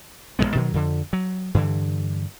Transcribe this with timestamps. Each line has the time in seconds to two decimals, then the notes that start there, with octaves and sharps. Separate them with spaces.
0.39 A1 F#3 G#3 B3
0.55 B2 D#3 F#3
0.74 F2 D3
1.13 F#3
1.54 G2 D3 E3